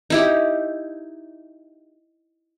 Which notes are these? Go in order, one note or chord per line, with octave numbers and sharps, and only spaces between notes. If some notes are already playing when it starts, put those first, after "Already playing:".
D#4 E4 G4